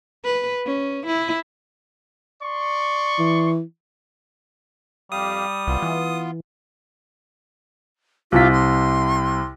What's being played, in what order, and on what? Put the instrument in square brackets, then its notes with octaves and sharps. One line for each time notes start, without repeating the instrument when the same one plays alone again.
[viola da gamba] B4
C#4
E4
[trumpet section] D5 C6 C#6
[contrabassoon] E3
[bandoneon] F2 G4 F5 [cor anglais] G3 [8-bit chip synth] D#6
[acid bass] C2 [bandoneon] B3 F4
[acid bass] E3
[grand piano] C2 C3 B6 [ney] F4
[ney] C6